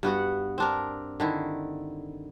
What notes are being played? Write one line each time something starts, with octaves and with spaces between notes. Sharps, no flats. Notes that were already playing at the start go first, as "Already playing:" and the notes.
G2 B3 F#4 F#5
C4 D4 A#4
D3 D#3 E4